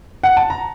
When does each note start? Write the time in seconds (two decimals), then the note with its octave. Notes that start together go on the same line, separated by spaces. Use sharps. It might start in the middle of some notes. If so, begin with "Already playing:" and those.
0.23 F#5
0.37 A5
0.50 A#5